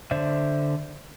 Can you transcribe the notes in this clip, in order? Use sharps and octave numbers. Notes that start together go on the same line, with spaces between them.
D3 C5 D5 E5